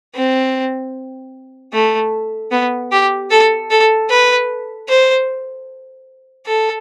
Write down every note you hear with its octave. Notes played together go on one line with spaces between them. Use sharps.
C4
A3
B3
G4
A4
A4
B4
C5
A4